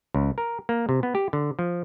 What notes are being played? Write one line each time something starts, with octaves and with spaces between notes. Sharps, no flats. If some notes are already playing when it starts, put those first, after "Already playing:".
C#2
A#4
A#3
C3
B3
G4
D3
F3